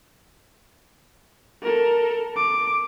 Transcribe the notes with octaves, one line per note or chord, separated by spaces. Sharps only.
A4 A#4
D6